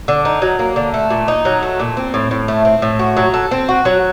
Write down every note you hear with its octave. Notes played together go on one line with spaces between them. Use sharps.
D3
D#4
F#3
A#3
D3
A3
A#2
D#4
F#3
A3
A#2
C4
A2
A2
A3
C4
A2
F#4
F#3
A4
C4
F#4
F#3